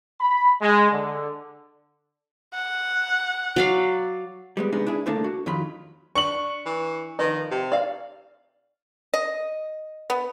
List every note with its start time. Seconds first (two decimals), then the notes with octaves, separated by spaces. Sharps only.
0.21 B5
0.61 G#3
0.91 D3
2.54 F#5
3.56 F#3 D5 F5
4.57 G3 G#3 B3
4.72 C3 G#3 B3 D4 D#4
4.86 D4 E4 G#4
5.06 C2 D3 A3 A#3 D4 A5
5.24 F#4
5.46 F2 D#3 F#3 F4 B5
6.15 D4 C#6 F#7
6.66 E3
7.19 D#3 F3 B4 D#5
7.51 C3
7.72 D5 F5
9.14 D#5
10.10 B3